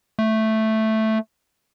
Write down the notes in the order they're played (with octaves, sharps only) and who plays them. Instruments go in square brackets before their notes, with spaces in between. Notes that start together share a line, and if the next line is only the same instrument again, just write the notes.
[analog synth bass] A3